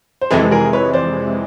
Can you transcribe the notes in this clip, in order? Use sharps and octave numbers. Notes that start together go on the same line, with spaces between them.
C5
F2 C3 E3 G#3 A4 B4
G#4 A#4
B4 C#5
C5 D5